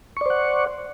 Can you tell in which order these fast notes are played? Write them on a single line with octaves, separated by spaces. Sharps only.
C#6 D5 C5 F#5